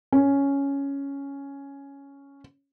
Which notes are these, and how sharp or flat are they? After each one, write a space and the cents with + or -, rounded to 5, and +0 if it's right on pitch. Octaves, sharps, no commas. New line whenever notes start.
C#4 +5